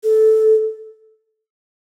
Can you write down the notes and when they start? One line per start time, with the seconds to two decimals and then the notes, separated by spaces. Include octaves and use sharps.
0.03 A4